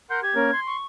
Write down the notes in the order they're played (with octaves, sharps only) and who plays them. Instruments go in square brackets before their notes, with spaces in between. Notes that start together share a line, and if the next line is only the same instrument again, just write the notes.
[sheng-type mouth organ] A#4 F#5 C6 [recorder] G6
[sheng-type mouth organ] G4 [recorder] G#6
[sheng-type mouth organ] A#3 C#4 A#4
C6
[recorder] C#6